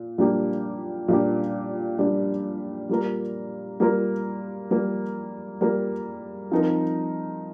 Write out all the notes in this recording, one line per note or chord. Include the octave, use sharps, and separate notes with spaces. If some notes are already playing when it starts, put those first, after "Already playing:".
Already playing: A#2
A#2 G3 A#3 D4 G4
A#2 G3 A#3 D4 G4
A#2 G3 A#3 D4 G4
G3 A#3 F4 A#4
G3 A#3 F4 A#4
G3 A#3 F4 A#4
G3 A#3 F4 A#4
F3 C4 D#4 A#4